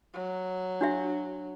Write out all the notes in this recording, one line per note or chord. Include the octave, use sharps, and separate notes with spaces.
F#3
D4 F#4 E5